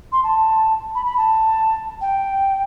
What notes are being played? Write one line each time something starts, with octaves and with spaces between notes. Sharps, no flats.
C6
A5
B5
B5
A5
G5